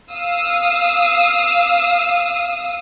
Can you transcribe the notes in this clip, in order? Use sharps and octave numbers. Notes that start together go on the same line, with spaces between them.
F5 D#6 E6